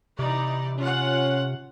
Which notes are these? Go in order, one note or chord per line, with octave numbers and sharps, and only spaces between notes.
C3 E3 D#4 D5
C#4 F4 F#5